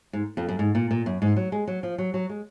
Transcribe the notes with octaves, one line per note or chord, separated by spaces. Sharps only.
G#2
F2
F#2
G#2
A#2
A#2
F#2
G#2
F#3
G#3
F#3
F3
F#3
F#3
G#3